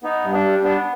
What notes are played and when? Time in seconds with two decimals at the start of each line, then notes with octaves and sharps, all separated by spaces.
0.03 B3 D#4
0.24 G2
0.33 D4
0.44 G3
0.64 B3 D4